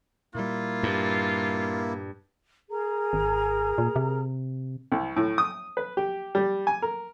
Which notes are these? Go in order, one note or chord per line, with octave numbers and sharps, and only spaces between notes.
A#2 G3 A#3 E4 F4
G2
G#4 A#4 A#5
G#1
A#2
C3
C2
A2
D#6
B4
G4
G3
G#5
A#4